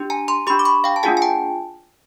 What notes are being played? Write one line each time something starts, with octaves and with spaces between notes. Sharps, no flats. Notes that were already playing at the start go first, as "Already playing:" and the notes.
Already playing: D4 G4
G#5 A#5
A#5 C6
D4 G4 B5 C#6
D6
B5 C#6
F5 G5
A5
A#3 D4 F4 G#4 F#5 G#5
G#5
G5 A5